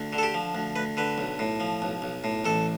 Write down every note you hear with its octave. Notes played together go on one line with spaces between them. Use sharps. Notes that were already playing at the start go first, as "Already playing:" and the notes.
Already playing: D2
D3
A4
G4
F3
D2
D2 B4
D3 B4
B1
A2
F3
B1
B1
A2
A1 A4